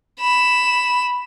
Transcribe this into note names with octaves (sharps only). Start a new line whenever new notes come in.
B5 E7